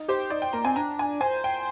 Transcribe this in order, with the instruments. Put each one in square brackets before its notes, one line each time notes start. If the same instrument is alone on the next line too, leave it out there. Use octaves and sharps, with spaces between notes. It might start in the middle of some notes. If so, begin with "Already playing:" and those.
Already playing: [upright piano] D#4
[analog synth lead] G4 [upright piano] C5
[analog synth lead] D#4 [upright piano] D5
[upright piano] G5
[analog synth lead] A#3 [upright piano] A#5
[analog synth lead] C4 [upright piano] G#5
[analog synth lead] D4 [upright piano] A#5
[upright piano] G#5
[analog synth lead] C5 [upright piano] G#5
[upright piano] G5